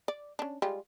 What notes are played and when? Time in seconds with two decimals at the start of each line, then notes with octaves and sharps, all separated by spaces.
0.08 D5
0.39 C#4 D4
0.62 G3 G#3 F4